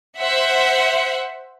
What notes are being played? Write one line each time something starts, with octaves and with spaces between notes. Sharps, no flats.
C5 E5 F#5